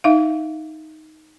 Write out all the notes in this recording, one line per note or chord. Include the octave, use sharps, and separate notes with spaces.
D#4 E5 F5